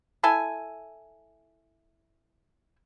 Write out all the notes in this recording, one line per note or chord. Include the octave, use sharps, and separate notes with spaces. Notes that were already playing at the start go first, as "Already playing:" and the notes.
E4 A4 G#5